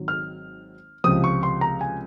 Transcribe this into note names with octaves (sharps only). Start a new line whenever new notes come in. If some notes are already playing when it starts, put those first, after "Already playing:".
Already playing: G#1 D#3 F#3
F6
C#2 C3 F3 D#6
C#6
C6
A#5
G#5